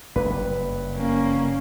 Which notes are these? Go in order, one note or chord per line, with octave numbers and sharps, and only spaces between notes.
F#1 G2 B4
A#3 C#4